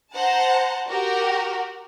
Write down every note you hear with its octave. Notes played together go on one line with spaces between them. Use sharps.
C5 F#5 A5 A#5
F#4 G4 A#4 F#5